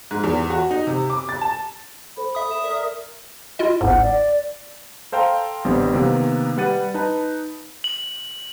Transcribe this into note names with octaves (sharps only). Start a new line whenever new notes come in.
G#2
E2
F#4
D#4
C3
D6
A6
A5
A4 C5 B5
E5 D#6
A4 E7
A#4 D5
E4 F4 D#5
G1 C2 G#2 F#5
D5
A4 C5 F5 G5 A#5
A1 D3 G3 B3 C4
C3 D#3 A#3 B3
G3 B4 F#5 A6 D#7
D#4 B4 A5
F#7